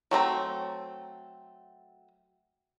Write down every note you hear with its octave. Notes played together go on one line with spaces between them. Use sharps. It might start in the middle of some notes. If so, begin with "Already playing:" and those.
F#3 A3 C4 A#5